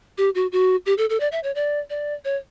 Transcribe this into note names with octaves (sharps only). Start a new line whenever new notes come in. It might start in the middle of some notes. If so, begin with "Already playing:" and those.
G4
F#4
F#4
G4
A4
A4
D5
E5
C#5
D5
D5
C#5